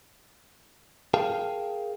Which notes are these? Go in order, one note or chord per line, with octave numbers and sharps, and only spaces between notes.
G#4 A#4 F5 G5 A5